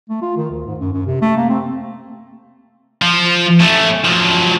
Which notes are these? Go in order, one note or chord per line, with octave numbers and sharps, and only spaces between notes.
A3
F4
D#3
D2
G#2
F#2
F#2
C3
A3
A#3
C4
F3
A3 C#4
F3 F#3